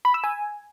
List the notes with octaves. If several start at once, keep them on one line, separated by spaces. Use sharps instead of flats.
B5
E6
G#5